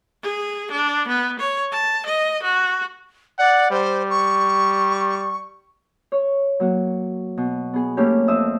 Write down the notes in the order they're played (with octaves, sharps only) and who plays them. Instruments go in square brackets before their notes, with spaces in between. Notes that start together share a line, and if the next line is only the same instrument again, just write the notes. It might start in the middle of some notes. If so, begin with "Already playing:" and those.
[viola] G#4
D4
B3
C#5
A5
D#5
F#4
[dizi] D5 [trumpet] F#5
[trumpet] G3 [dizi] C5
[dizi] C#6
[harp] C#5
F#3 A#3 F#4
B2
B3 G#4
A3 A#3 C#4 E4 G4
F2 C4 E5 D#6 E6